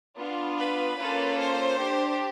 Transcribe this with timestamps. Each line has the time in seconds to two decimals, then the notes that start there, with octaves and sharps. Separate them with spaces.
0.17 B3 D4 F4
0.58 B4
0.97 A#3 C#4 F4 A4
1.38 C5
1.78 D4 G4